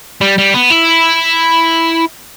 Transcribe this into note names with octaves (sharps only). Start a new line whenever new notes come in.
G3
G3
B3
E4